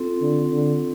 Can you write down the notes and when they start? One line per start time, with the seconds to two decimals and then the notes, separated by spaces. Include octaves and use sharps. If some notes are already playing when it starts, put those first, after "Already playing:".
Already playing: C4 F4 A4
0.21 D3
0.52 D3